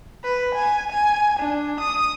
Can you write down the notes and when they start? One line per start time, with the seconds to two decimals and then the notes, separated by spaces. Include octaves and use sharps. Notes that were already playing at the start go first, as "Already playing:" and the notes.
0.24 B4
0.55 G#5
0.91 G#5
1.40 D4
1.80 D#6